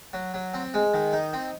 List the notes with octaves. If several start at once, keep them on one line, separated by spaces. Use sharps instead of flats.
F#3
F#3
C4
G#3
D#3
D#4
C4